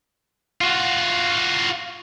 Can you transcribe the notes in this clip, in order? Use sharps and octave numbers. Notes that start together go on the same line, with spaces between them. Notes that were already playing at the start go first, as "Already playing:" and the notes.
F4 F#4